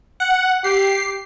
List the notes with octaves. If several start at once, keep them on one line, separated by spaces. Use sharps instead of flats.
F#5
G4 C7